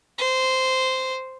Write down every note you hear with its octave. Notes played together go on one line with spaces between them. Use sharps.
C5